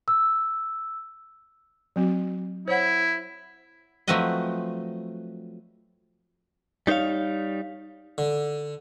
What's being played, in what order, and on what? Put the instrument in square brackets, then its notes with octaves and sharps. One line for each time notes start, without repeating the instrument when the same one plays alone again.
[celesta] E6
[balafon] F#3 C4 F#4
[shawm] E4 [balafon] C5 C#5 F#5
[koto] F3 F#3 A3 C4 B4 D#5
[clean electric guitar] G3 D#4 C5 C#5 F5
[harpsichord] D3